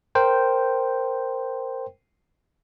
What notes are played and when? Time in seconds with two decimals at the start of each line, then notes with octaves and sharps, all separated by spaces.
0.15 A#4 C5 G5